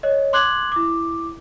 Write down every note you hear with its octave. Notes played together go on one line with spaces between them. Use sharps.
C#5 D#5
C6 D6 F#6 G#6 F#7
E4 D6